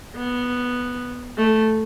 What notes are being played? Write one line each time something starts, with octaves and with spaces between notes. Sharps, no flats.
B3
A3